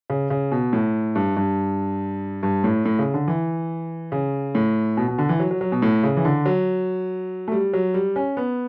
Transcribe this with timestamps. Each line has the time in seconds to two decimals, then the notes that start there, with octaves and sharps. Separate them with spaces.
0.10 C#3
0.30 C#3
0.52 B2
0.73 A2
1.15 G2
1.37 G2
2.43 G2
2.64 A2
2.85 A2
2.99 C#3
3.14 D3
3.28 E3
4.12 C#3
4.55 A2
4.97 B2
5.08 B2
5.18 D3
5.29 E3
5.40 F#3
5.51 F#3
5.61 F#3
5.72 B2
5.82 A2
6.03 C#3
6.17 E3
6.25 D3
6.46 F#3
7.48 A3
7.52 G3
7.73 F#3
7.94 G3
8.16 C#4
8.37 B3